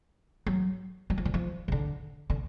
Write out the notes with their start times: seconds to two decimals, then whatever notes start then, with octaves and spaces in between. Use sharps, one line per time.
0.47 F#3
1.10 F#3
1.18 F3
1.25 D3
1.34 F3
1.68 C#3
1.72 D3
2.30 D3